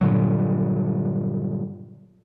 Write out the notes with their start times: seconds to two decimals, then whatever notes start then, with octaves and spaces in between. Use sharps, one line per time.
0.01 G2 A#2 D3 F#3